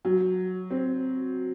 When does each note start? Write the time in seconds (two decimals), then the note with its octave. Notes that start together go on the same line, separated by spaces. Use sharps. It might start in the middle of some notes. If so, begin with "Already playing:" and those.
0.05 F#3
0.71 C4